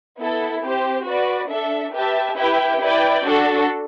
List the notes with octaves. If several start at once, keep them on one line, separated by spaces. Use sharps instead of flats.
B3 E4 A4
C4 G4 C5
F#4 B4 D5
D4 A4 E5
G4 B4 E5 A5
E4 G4 B4 E5 G5
E4 B4 D5 G5
D4 F#4 A4